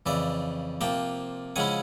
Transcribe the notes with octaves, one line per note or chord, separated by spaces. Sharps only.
F2 C#3 E3 D5 E5
C3 F3 A#3 G5 A5
C#3 F3 G#3 C#4 E4 F#5 G#5